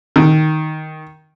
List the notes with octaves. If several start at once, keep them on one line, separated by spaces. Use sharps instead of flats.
D#3